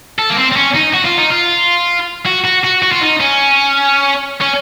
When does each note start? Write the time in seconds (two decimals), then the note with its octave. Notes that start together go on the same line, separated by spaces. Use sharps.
0.19 A4
0.30 A#3
0.37 C4
0.52 C4
0.56 C#4
0.75 D#4
0.94 F#4
1.05 F4
1.17 D#4
1.30 F4
2.26 F#4
2.44 F#4
2.64 F#4
2.83 F#4
2.92 F4
3.01 D#4
3.20 C#4
4.41 C#4